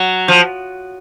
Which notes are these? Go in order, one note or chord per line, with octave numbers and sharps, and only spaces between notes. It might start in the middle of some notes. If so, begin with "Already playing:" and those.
Already playing: F#3
F3